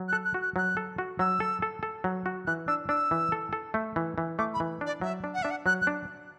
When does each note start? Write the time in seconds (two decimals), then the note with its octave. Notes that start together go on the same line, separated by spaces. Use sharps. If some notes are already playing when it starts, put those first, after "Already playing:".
Already playing: F#3
0.08 F#6
0.13 A4
0.25 F#6
0.34 F#4
0.42 F#6
0.56 F#3 F#6
0.77 A4
0.98 F#4
1.19 F#3 E6
1.40 A4
1.62 A4
1.83 A4
2.04 F#3
2.26 F#4
2.47 E3 F#6
2.68 D4 E6
2.89 D4 E6
3.11 E3
3.32 A4
3.53 A4
3.74 A3
3.96 E3
4.18 E3
4.38 A3 D6
4.54 B5
4.60 E3
4.81 D4 D5
5.01 F#3 E5
5.24 D4
5.34 F#5
5.43 D4 E5
5.51 F#5
5.66 F#3 F#6
5.82 F#6
5.87 D4